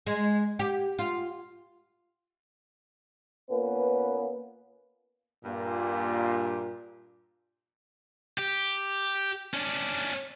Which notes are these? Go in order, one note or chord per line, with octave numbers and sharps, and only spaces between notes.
G#3
G4
F4
A#2 A#3 B3 C#4 B4
G2 A#2
G4
C#4 D4